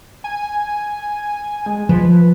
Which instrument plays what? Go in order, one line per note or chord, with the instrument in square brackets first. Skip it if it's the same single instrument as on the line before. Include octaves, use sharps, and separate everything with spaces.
[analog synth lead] G#5
G#3
[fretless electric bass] F3 [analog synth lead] B4